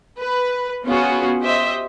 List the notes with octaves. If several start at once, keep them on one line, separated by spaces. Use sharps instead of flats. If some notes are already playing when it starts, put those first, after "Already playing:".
B4
B3 C#4 F4 F#4 G#4
G4 C5 D#5 E5